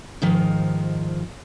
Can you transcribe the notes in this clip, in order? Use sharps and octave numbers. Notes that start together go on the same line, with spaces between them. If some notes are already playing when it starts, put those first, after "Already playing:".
G#2 D#3 F3